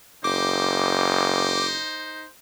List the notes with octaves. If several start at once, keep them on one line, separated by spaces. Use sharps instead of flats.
F#1 D#4 C5 D6